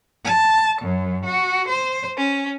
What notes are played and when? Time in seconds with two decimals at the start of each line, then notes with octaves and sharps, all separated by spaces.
0.23 A5
0.80 F#2
1.26 F#4
1.68 C5
2.17 C#4